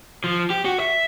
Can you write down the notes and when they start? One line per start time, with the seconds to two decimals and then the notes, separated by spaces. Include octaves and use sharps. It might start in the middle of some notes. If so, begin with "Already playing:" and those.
0.24 F3
0.50 G4
0.65 F#4
0.80 E5